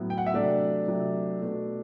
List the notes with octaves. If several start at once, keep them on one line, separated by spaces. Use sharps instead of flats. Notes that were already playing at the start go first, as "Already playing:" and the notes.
Already playing: A2 F#3 B3
G5
F#5
E5
C3 F#3 A3 D4 D5
C3 F#3 A3
B2 A3